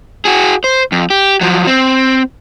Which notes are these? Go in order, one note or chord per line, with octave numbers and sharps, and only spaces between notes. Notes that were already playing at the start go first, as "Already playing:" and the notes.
F#4 G#4
C5
F2
G4
F3 F#3
C4